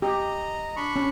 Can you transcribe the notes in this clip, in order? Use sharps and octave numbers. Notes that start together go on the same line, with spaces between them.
G4 D#5 A#5
D4 B5 C#6
C#4